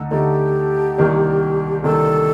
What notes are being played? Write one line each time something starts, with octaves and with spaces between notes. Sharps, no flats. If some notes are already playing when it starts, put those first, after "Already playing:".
Already playing: D2 D3 A3 D#4 A4
D2 D3 A3 D#4 G4 A4
C2 C3 D#3 A#3 D4
C2 C3 D#3 A#3 D4 A4